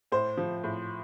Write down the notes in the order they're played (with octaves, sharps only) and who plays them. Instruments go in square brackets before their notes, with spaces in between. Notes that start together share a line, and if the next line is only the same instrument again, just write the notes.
[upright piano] A2 C5
F3
A2